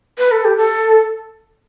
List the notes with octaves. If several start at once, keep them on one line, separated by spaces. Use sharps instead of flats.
B4
A4
G4
A4